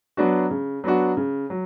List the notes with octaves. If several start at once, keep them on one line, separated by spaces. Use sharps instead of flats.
F#3 B3 D4 F#4
C#3
F#3 B3 D4 F#4
C#3
F#3